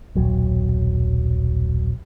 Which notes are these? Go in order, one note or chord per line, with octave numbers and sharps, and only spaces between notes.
D#1 B1 F#3